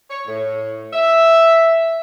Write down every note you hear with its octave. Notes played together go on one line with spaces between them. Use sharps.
C#5
A2
E5